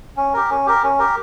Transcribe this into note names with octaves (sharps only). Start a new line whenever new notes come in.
C#4
G4 A#4
C#4
G4 A#4
C#4
G4 A#4